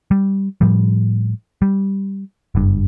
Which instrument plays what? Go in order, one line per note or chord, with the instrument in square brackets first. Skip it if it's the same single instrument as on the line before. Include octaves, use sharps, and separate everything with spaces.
[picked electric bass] G3
A2 F3 G3
G3
F#1 G2